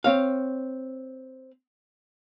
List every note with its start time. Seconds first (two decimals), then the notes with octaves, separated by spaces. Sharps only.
0.04 C4 C#5 F5